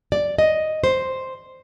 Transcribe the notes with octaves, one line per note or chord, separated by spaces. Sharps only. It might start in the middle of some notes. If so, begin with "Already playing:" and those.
D5
D#5
C5